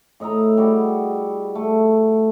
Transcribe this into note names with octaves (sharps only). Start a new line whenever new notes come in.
A2 D#5 E5 A#5
G3 F#4 G#4
A3